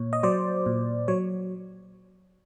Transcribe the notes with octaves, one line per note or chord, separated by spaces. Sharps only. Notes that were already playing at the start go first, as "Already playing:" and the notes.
Already playing: A#2 C#5
D#5
F#3 C5 D5
A#2
F#3 C#5